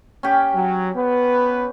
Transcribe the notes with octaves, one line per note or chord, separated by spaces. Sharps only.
C#4 G4
F#3
B3 B4